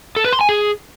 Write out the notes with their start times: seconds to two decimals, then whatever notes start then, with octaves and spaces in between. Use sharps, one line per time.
0.16 A4
0.25 B4
0.33 C6
0.41 G#5
0.49 G#4